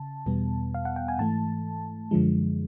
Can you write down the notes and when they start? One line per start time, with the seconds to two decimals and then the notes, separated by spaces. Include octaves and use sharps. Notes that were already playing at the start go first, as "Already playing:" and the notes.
Already playing: C#3 A5
0.26 E2 B2 G3 B3
0.75 F5
0.85 F#5
0.96 G5
1.08 G#5
1.18 G#2 E3 A3 A5
2.11 F#2 D3 F3 G#3